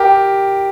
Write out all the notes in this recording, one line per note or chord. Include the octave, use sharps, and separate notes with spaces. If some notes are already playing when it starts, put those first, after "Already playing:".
Already playing: G4 A#4